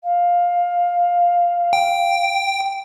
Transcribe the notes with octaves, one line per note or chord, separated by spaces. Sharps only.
F5
G5